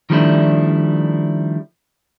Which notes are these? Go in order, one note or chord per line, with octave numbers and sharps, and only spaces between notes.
D#3 F3 G3 A3 D4 E4